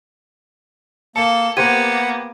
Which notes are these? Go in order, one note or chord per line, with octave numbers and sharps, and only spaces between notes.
A#3 A4 A5 C#7
A#3 B3 G4 C5 F#5 G#6 D#7